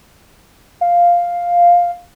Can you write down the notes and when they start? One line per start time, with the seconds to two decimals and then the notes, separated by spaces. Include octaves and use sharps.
0.81 F5